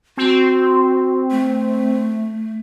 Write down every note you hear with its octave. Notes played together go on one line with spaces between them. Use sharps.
C4 F#4
A3